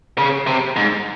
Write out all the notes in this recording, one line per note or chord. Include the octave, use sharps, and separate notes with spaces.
C#3
C3
G#2